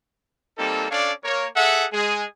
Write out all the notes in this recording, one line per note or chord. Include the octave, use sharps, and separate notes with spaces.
G3 A#3 C4 D#4 A4
C#4 D4 A4 C#5 D5 F5
A#3 A#4 C#5
G#4 A4 E5 F#5
G#3 G#4